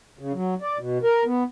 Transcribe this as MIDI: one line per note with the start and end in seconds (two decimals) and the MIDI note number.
0.19 0.33 49
0.34 0.54 54
0.62 0.78 74
0.78 0.98 47
1.03 1.24 70
1.25 1.43 59